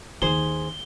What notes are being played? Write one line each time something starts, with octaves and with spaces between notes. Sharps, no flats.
D#2 D#3 G#4 C5 G7